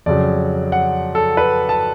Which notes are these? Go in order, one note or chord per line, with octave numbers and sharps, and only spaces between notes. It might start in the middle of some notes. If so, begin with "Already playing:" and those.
F2 C#3 F#3 D5
F#5
A4
B4
A5